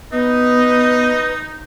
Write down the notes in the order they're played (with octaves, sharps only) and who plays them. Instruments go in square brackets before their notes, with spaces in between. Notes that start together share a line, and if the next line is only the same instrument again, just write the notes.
[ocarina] B3 [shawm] D#4 [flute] B4 [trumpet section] D#5